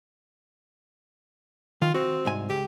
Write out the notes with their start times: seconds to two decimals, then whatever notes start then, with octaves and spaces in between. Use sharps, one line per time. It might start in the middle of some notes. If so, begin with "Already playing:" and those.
1.82 D#3 F4
1.94 C4 F#4
2.25 C2 G#2 G#5
2.49 C#2 G4